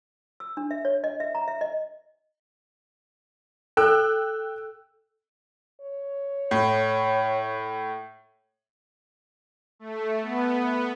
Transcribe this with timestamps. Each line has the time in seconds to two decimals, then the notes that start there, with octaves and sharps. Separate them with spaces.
0.40 E6
0.57 D4
0.71 E5
0.85 C#5
1.04 D#5
1.20 E5
1.35 A#5
1.48 E5
1.61 D#5
3.77 A4 G5 E6 F#6
5.81 C#5
6.51 A2
9.79 A3
10.22 B3